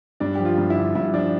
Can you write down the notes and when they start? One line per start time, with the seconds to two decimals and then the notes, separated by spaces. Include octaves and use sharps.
0.20 G2 D4
0.35 F3 G4
0.45 F4
0.58 G2
0.70 E4
0.76 D3
0.95 G2 E4
1.14 F3 D4